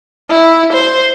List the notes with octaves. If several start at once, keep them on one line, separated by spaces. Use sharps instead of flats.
E4
C5